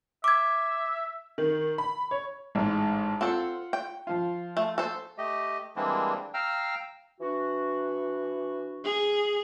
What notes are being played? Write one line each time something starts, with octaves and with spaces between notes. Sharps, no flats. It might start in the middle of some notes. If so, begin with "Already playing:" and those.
E5 D6 G#6
D#3
B5
C#5
A1 G#2
C4 F4 A4 F#5
G5
F3 F4
A3
A4 C5
A3 G4 D#5
E3 G3 G#3 A#3 C4 D4
F5 G5 A#5 E6 F6
E3 D4 F#4
G#4